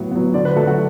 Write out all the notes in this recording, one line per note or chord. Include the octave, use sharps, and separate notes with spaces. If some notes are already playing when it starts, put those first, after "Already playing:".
Already playing: A2 F#3 B3
F#3 B3
D3 D5
B4
F#3 A3 A4
F#4